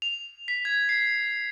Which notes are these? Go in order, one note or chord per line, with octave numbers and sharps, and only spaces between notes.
F7
B6
G#6
C7